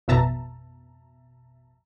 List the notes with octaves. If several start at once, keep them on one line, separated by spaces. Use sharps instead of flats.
A1 F2 B2 E5 A5 A#5